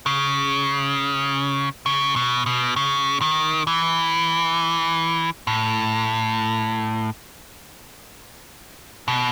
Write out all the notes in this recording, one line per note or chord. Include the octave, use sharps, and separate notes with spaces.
C#3
C#3
B2
B2
C#3
D#3
E3
A2
B2